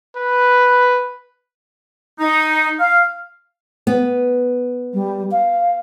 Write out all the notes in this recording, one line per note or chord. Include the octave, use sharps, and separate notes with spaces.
B4
D#4
F5
B3
G3
F5